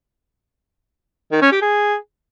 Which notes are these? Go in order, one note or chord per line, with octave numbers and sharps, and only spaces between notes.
D#3
C#4
G4
G#4